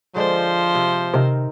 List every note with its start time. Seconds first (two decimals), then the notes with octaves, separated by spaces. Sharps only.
0.16 D3 F3 G#3 C5 D5
0.75 C3
1.14 C3 D#3 C4 A#4